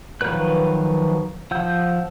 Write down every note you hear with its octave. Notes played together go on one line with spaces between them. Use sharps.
D#3 F3 F#3 B4 F#6
F3 F#5 E6 G6